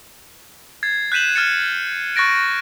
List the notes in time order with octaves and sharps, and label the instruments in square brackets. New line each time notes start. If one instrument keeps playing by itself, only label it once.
[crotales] G#6 A6 C7
F#6 G6 B6 D#7 E7 F#7
F6 A6 C#7
C#6 F#6 A6 A#6 D7